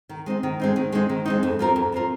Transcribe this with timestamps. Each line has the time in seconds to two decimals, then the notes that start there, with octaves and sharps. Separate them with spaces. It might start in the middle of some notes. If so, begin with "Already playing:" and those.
0.09 D#3
0.26 G#3 C4 D#4
0.43 D#3
0.60 G#3 C4 D#4
0.76 D#3
0.92 G#3 C4 D#4
1.09 D#3
1.26 G#3 C4 D#4
1.43 F2
1.59 F3 C4 F4 A#4
1.76 F2
1.92 F3 C4 F4 A#4